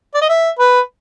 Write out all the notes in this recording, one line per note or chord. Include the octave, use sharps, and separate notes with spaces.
D5
D#5
E5
B4